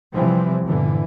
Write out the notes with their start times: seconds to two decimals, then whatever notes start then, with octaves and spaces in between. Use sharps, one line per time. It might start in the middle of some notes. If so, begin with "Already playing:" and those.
0.12 C3 E3 F3 G3 C4
0.65 G1 A#2 D3 E3